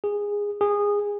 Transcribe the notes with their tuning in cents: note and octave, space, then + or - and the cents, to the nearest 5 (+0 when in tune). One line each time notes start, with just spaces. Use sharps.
G#4 -15
G#4 -20